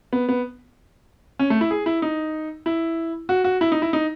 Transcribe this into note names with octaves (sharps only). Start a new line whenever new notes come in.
B3
B3
C#4
A3
E4
G#4
E4
D#4
E4
F#4
F#4
E4
D#4
E4
D#4